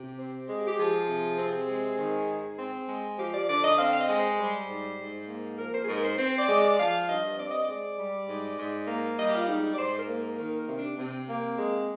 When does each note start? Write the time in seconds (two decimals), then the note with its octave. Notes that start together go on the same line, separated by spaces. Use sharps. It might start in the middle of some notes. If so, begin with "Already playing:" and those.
Already playing: C3 G4
0.18 C4
0.48 G#3
0.67 G4
0.78 F3 G#4
1.08 C3
1.39 C4
1.69 G#3
1.99 D#3
2.28 G#2
2.58 C4
2.88 G#3
3.18 F3 G4
3.34 D5
3.48 D3 D5
3.63 D#5
3.78 C4 F5
3.93 F5
3.99 D#5
4.08 G#3
4.18 C5
4.39 G3 C5
4.68 G#2
4.99 G#2
5.29 A#3
5.58 F3 A#4
5.74 C5
5.83 G#4
5.88 G#2 A#4
6.03 C5
6.18 C4 C5
6.38 D5
6.48 G#3
6.58 D5
6.78 F3 F5
7.08 G2 D#5
7.38 C4 D5
7.51 D#5
7.65 G#3 D5
7.98 G3
8.28 G#2
8.58 G#2
8.88 A#3
9.18 G3 D#5
9.29 G4
9.34 F4
9.48 G#2 D#4
9.63 D#4
9.73 D5
9.78 G#2 C5
9.98 A#4
10.08 A#3
10.18 A#4
10.38 D#3 A#4
10.59 A#4
10.69 C3
10.77 D4
10.98 C3 C4
11.28 A#3
11.58 G#3